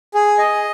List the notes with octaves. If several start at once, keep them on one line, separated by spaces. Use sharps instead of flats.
G#4
D#5